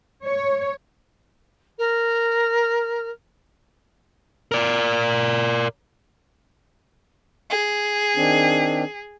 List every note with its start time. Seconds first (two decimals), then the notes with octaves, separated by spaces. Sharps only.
0.24 C#5
1.78 A#4
4.52 A#4 D5
7.50 G#4
8.17 D#3 C4 D4